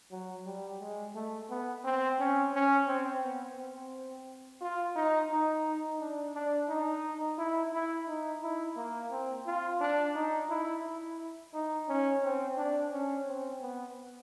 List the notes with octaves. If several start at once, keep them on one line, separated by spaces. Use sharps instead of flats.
F#3
G3
G#3
A3
B3
C4
C#4
C#4
C4
B3
C4
F4
D#4
D#4
D4
D4
D#4
E4
E4
D#4
E4
A#3
C4
F4
D4
D#4
E4
E4
D#4
C#4
C4
D4
C#4
C4
B3